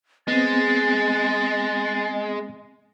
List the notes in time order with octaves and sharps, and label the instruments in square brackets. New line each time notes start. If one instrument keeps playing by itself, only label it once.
[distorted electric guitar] G#3 [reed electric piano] B3 C4 [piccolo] A6